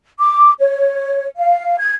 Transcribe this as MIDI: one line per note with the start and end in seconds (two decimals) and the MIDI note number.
0.19 0.52 86
0.60 1.26 73
1.37 1.76 77
1.79 1.93 92